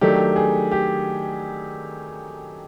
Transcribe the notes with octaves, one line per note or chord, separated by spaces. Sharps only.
D#3 F#3 A3 D4 G4
G#4
G4